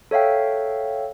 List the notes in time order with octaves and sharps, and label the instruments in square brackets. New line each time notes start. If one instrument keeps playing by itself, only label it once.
[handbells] A4 C#5 E5 F5 G5